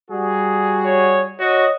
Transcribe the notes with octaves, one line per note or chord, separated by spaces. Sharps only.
G3 F#4 G#4
C#5
F#4 C#5 D#5